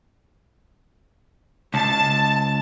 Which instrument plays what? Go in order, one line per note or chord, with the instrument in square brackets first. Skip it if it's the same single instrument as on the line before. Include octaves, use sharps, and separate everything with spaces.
[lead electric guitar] C#2 [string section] A5